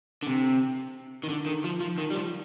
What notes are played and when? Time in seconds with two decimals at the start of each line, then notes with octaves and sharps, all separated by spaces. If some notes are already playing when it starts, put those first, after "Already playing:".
0.23 D3
0.27 C3
1.24 D#3
1.29 D3
1.46 D#3
1.64 F3
1.80 F3
1.98 D#3
2.10 G3
2.15 F3